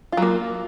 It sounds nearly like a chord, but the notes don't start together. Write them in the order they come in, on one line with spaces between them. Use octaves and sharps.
F4 F#3 A#3